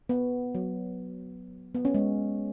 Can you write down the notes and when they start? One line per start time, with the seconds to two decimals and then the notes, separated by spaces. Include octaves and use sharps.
0.09 B3
0.55 F#3
1.75 B3
1.85 C#4
1.95 G#3